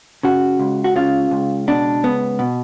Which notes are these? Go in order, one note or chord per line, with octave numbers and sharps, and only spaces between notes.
C#3 F#4
C#2
F#4
C#3 F4
C#2
B2 D4
C#2 B3
B2